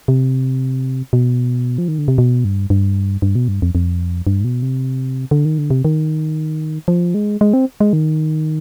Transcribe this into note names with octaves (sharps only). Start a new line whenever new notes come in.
C3
B2
F3
D#3
D3
C3
B2
G2
G2
G2
B2
G2
F2
F2
G2
G#2
B2
C3
D3
D#3
D3
C3
D#3
F3
G#3
G#3
C4
G#3
D#3